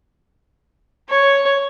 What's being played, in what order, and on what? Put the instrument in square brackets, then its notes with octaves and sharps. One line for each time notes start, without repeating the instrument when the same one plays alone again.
[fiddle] C#5